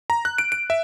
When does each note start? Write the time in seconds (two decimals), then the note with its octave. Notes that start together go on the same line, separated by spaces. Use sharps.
0.10 A#5
0.25 F#6
0.38 D7
0.52 D7
0.70 E5